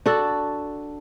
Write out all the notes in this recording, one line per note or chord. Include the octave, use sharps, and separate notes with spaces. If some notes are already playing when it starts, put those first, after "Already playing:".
D4 F#4 A4